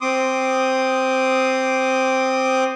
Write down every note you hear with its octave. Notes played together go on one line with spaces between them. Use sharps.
C4 C6 D6 D#6